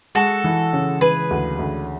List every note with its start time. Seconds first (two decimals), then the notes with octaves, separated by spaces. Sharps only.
0.15 G#3 F#4 A4
0.44 E3
0.73 C#3
1.01 E3 G#4 B4
1.31 D2
1.59 D2